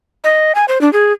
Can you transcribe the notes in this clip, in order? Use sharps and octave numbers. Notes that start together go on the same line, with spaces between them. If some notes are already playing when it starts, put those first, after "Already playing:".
D#5
G#5
C5
D4
G#4